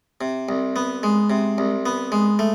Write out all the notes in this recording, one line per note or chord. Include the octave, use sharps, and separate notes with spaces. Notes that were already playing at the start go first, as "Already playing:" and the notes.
C3
C2
B3
G#3
C3
C2
B3
G#3
A3